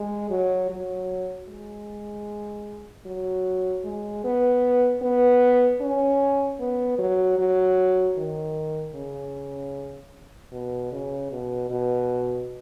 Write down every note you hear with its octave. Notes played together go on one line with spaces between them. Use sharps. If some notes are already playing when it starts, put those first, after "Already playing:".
Already playing: G#3
F#3
F#3
G#3
F#3
G#3
B3
B3
C#4
B3
F#3
F#3
D#3
C#3
B2
C#3
B2
B2